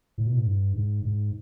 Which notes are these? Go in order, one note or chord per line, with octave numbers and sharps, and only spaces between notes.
A2
B2
A2
G2
G#2
G#2